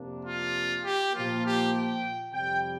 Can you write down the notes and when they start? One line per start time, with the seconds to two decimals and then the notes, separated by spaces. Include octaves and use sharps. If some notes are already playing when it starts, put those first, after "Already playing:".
Already playing: F2 C3 A#3 D4
0.24 F4
0.84 G4
1.13 A#2 F3 A#3 F4
1.43 G4
1.73 G5
2.33 F2 C3 G3 G5